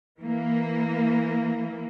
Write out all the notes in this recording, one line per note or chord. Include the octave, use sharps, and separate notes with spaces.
E3 A#3